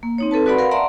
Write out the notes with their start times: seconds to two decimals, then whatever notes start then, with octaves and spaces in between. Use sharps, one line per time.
0.03 A#3
0.18 C4 D#4 C#5
0.31 C4 A4 B4 A5
0.46 F#4 B4 D5 F#5 B5 C6
0.58 A#4 F5 F#5 B5
0.71 D5 E5 F#5 A5 A#5 C6